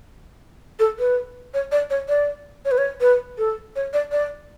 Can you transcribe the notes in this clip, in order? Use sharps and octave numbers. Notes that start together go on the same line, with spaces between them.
A4
B4
C#5
D5
C#5
D5
C#5
B4
C#5
B4
A4
C#5
D5
D5